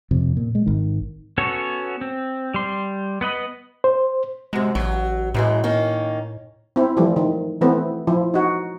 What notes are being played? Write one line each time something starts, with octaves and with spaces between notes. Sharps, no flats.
F2 C3
A#2
G#3
G#1 D#3
B3 C#4 F#4 A4 C#5
C4
G3 C6
B3 B4 D#5 B5
C5
F#2 C3 G#3
A1 F#3
F#2 A2 E3 G#3
D#3 A#3 C#4
C4 E4
E3 F3 G3 A3
D#3
E3 A3 B3 C4
F3 E4
D#4 F#4